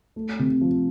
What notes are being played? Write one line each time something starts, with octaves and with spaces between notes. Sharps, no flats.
A3
C3
F3